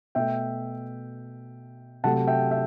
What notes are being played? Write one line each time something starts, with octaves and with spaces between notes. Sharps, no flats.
B2 A3 E5 G5
C3 F#3 A3 F#5 A5
E5 G5
E5 G5